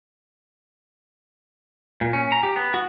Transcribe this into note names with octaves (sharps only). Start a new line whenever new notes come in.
A#2
C#4
A#5
G4
B3
F#4